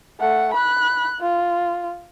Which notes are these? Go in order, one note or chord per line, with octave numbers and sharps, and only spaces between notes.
A3 F#5
B5 F#6
F4